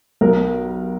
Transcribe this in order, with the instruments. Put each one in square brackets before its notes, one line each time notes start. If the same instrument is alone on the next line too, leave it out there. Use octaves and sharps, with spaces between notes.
[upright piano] B1 A#4